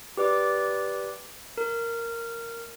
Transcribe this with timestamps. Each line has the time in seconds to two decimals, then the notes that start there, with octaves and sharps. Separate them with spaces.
0.17 G4 B4 D5 D6
1.58 A#4